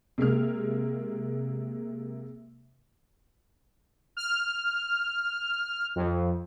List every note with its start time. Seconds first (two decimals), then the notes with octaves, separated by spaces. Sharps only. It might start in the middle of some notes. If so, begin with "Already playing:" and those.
0.18 C3 G#3 A#3 F6
4.17 F6
5.96 F2